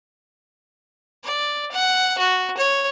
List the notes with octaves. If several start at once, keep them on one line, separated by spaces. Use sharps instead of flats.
D5
F#5
F#4
C#5